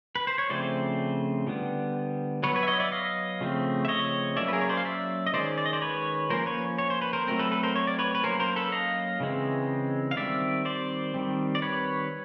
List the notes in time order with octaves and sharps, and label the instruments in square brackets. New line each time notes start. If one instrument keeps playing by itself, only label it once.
[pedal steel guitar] B4
C5
C#5
C#3 F3 A3 C4 C5 D5
D3 G3 B3
F#3 B4 C#5
B3
B4 C#5
E5
C#5 D#5
D5 E5
D#5 F5
C#3 F3 A3 C4
E5
C#5 D#5
F#3 A#3 C#4 D5 E5
B4
G#4 A#4
C#5
C5 D5
F5
D5 E5
D#5
D#3 G#3 C#4 C5 D5
D5
D#5
C5 D5
B4 C#5
F3 A#3 C#4 A#4 C5
B4 C#5
C#5
C5
B4
A#4 C5
F#3 A3 C4 A#4
A4 B4
A4 B4
A#4 C5
C#5
D5
B4 C#5
B4
F#3 A#3 C#4 A#4 C5
A#4 C5
A4 B4
D#5 F5
C#3 E3 G#3 C4
F5
D#3 G3 C4 D5 E5
C5 D5
D#3 G3 C4
D5
B4 C#5